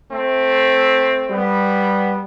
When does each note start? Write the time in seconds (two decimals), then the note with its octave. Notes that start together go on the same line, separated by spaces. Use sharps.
0.11 A3 C4
1.31 G3 B3